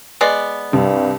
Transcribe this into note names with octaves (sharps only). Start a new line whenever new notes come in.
G#3 B3 D5
C2 G2